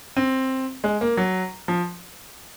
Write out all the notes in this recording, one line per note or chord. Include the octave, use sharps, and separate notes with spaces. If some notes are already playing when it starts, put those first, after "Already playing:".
C4
G#3
A#3
F#3
F3